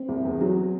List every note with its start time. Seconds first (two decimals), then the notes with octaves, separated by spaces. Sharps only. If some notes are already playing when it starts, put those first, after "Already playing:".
Already playing: C4
0.09 C2
0.25 E2
0.41 F#3